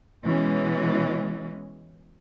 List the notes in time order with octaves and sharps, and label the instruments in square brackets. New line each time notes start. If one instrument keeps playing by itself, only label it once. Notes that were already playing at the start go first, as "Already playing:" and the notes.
[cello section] B2 E3 G#3 C#4